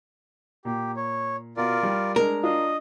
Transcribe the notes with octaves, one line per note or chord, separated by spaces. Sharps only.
A#2 G4
C#5
B2 F4 A#4 D5
G3
G#3 D4 A#4
D4 F4 D#5